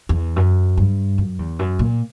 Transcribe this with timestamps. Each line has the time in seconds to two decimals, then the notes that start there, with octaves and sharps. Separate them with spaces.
0.09 E2
0.36 F#2
0.77 G2
1.18 F#2
1.39 E2
1.59 F#2
1.79 A#2